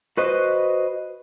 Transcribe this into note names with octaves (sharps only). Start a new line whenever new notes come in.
F#4 B4 C5 D#5